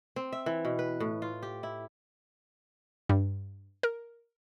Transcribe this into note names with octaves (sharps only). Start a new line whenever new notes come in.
C4
E5
E3
B2
B4
A2
F4
G4
E4
G2
A#4